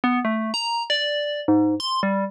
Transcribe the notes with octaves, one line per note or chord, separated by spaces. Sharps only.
B3
A3
A#5
D5
G#2
C6
G3